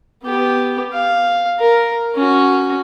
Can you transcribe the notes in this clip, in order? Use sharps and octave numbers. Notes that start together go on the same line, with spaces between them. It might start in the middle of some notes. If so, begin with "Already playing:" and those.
B3 G4
F5
A#4
C#4 F#4